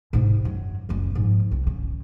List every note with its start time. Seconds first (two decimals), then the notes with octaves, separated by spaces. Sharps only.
0.13 G#2 C3
0.45 F#2 F#3
0.89 F#1 C#2
1.15 G#2 F3
1.51 C2
1.67 C#3